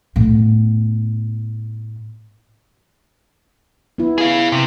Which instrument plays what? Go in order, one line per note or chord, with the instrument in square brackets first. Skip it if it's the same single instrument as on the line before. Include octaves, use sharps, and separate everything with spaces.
[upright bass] A2 B3
[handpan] B3 E4
[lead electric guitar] G#4 F5
C3